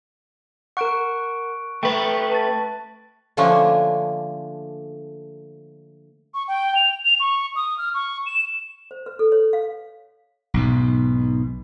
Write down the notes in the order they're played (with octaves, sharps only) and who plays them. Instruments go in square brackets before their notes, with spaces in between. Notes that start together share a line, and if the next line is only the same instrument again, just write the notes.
[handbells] A#4 F#5 [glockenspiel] C#6 F#6 D7
[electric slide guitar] A3 B4 [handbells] G5
[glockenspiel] A5 A6
[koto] D3 F3 A3 A#3 C#4 D4
[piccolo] C#6
G5
F7
F7
C#6
D#6
F6
C#6
E7
[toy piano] C5
B4
A4
C#5
F5
[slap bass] B1 G#2 B2